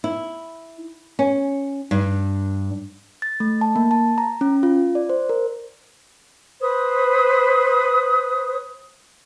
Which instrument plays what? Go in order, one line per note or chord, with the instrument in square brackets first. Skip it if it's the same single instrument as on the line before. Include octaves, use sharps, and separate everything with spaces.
[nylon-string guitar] E4
C#4
G2
[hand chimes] A6
A3
A5
A#3
A5
A#5
C#4
F4
D5
C5
A#4
[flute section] B4 C5 D#6